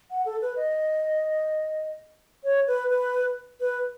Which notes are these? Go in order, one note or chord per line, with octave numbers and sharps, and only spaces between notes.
F#5
A4
B4
D#5
C#5
B4
B4
B4